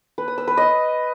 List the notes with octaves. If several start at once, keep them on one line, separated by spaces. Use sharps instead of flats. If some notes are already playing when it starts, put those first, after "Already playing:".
B4
D#6
E6
B4
D#5